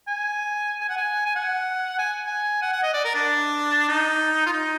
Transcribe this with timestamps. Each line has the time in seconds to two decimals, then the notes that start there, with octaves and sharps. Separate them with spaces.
0.08 G#5
0.81 G#5
0.89 F#5
0.97 G#5
1.26 G#5
1.35 F#5
1.99 G#5
2.26 G#5
2.62 F#5
2.73 F#5
2.83 D#5
2.94 D5
3.04 A#4
3.15 D4
3.89 D#4
4.46 F4
4.52 D#4